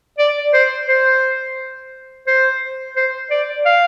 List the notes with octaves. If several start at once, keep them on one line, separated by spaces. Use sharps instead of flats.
D5
C5
C5
C5
C5
D5
F5